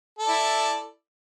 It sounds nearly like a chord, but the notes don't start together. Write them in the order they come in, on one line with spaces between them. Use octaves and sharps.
A4 D5 E4